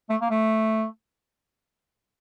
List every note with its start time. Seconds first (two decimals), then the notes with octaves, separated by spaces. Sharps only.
0.10 A3
0.21 A#3
0.30 A3